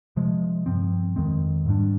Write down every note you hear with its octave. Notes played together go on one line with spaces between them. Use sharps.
C3 F3 G#3
G2 F3 C4
F2 D#3 G#3 C4
G#2 G3 D4